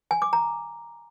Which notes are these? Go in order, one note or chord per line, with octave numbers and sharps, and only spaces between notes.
G#5
D6
A#5